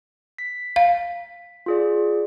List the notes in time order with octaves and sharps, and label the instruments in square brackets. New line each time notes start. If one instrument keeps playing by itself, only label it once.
[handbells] B6
[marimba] F5
[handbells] F4 G#4 D5